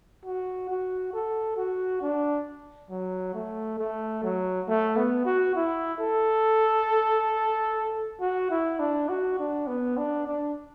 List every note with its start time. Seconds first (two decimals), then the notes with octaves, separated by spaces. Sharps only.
0.25 F#4
0.70 F#4
1.13 A4
1.57 F#4
2.02 D4
2.90 F#3
3.34 A3
3.79 A3
4.23 F#3
4.68 A3
4.97 B3
5.26 F#4
5.56 E4
6.00 A4
8.21 F#4
8.50 E4
8.80 D4
9.09 F#4
9.39 D4
9.68 B3
9.98 D4
10.27 D4